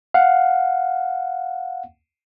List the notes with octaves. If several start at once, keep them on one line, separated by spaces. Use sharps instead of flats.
F5 F#5